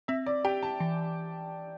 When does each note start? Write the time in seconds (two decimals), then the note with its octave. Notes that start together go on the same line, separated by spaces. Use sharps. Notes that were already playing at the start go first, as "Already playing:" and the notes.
0.08 C4 E5
0.26 D5
0.45 G4 G5
0.63 A5
0.80 E3